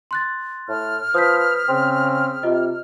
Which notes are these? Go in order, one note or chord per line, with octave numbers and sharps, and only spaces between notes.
C6 F#6 A6
A2 F6
F3 B4 D#6 G6 B6
C#3 C4
C3 F4 D#5